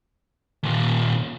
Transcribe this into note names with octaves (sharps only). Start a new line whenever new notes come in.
D#2 A#2